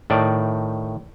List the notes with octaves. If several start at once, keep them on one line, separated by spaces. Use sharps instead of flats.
A2 D#3 D5